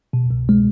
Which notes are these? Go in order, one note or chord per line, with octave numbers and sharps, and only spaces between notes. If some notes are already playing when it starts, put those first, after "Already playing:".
B2
C2
G#3